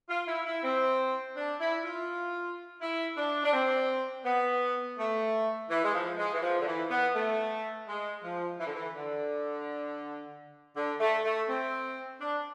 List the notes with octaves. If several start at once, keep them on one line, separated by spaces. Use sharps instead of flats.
F4
E4
E4
C4
D4
E4
F4
E4
D4
D4
C4
B3
A3
E3
G#3
F3
G#3
E3
F3
D3
E3
B3
A3
G#3
F3
E3
D3
E3
D3
D3
A3
A3
C4
D4